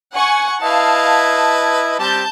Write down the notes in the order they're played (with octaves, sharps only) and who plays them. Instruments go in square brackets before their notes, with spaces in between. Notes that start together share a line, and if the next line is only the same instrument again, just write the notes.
[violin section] F#5 G#5 C#6
[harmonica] E4 B4 D#5 [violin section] F5 A5
[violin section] A5
[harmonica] G3 C4 G4 [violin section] A5 G6